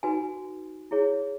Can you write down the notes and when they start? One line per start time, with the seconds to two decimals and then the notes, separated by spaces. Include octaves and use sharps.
0.03 D#4 F#4 B4 G#5
0.91 E4 G#4 C#5